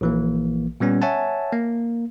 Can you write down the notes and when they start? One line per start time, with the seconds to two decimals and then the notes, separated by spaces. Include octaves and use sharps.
0.01 A#1 E3 A#3
0.80 A#2 G3 B3 C#4
1.02 C#5 E5 F#5 G#5 A5
1.53 A#3